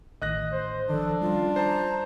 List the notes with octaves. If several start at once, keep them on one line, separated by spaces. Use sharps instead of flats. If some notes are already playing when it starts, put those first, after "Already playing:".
A1 D#3 D#5 F#6 A#6
C5
D#3 F3 D4 A4
G3 C#4 F4
C5 A5 A#5